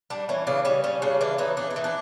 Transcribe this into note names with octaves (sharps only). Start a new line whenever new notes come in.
G3 D4
E3 C#4
C#3 D4
G3 C#4
G3 C#4
C#3 D4
E3 D4
E3 D#4
E3 D4
D#4
E3
D4